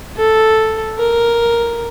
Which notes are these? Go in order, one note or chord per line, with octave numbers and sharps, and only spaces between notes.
A4
A#4